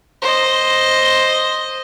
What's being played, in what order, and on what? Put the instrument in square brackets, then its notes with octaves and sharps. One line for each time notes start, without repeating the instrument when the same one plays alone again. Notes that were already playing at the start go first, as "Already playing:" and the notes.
[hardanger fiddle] C5 D#5